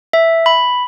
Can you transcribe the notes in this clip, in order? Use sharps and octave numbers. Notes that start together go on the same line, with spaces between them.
E5
B5